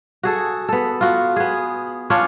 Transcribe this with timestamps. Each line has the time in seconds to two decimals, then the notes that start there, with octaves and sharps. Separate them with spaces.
0.23 F#4 G#4 A4
0.69 B3 A4
1.01 F4 F#4
1.36 B3 G#4
2.10 C#4 D4 F4 C#5